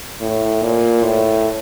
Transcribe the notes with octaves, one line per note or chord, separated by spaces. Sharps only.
A2
A#2
A2